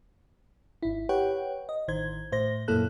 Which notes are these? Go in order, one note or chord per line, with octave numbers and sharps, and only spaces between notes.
G#1 E4
G4 B4 C#5 F#5 G5
D#5
A1 D#3 C5 G#6
A2 C5 A#6
F#2 A#2 A#3 E4 A4 F#6